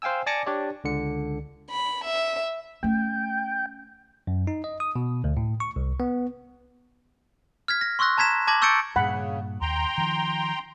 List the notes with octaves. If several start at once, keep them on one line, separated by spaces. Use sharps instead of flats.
C5 F5 G5 G#5 E6
D5 G#5 A5 D6 A#6 C#7
D4 G4 C#5 D5
C#2 D3 C#7
B5
E5
A3 C#4 G5
F#2
D#4
D#5
D#6
B2
D2
A2
C#6
C2
B3
F6 G#6 B6
A#6
C6 C#6 E6 F#6 A#6
A5 A#5 G#6 B6 E7
A5 D6 G#6 A#6 F#7
C#6 E6 G6 A6 C#7 D7
G2 A#2 C#3 F#5 B5
D#2 G5 A#5 C6
D#3 F3